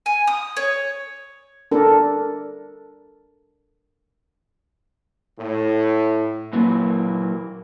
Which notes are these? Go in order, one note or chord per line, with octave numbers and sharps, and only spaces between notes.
G#5
D#6
C#5
D4 A4 A#4
A2
A#2 E3 F#3 A#3